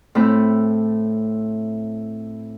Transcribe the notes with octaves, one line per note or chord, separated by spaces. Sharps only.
A2 A3 C4 E4